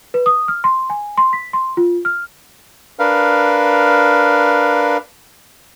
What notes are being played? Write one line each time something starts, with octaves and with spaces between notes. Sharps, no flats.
B4
D#6
F6
C6
G#5
C6
B6
C6
F4
F6
D4 A#4 B4 F5